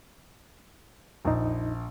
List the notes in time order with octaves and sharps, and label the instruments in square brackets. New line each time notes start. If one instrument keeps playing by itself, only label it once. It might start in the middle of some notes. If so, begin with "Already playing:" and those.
[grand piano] A#1 [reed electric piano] F2 D#4